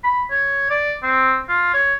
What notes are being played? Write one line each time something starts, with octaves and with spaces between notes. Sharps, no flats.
B5
C#5
D5
C4
F4
C#5